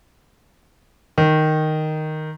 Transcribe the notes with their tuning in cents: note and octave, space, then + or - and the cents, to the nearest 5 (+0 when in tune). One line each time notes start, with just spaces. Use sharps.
D#3 -5